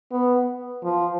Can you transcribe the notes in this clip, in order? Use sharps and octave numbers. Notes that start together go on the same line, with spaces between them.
B3
F3